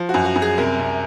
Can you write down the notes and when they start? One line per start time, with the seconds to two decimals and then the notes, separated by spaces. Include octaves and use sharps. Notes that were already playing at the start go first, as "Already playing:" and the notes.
Already playing: F3
0.09 F#4
0.14 F#2
0.25 F#4
0.36 F#2
0.42 G#4
0.58 C2 A#4
0.79 C2